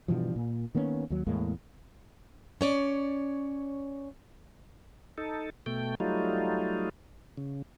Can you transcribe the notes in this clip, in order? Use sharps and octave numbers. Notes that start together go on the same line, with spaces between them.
G2 B2 E3 F3
A#2
D#3 A#3 B3 C#4
D#2 F#3
E2 A2 G#3 A#3
C#4 C#5 D5
D#4 A4
B2 A3 G5
F#3 G3 A3 D#4 F4
C#3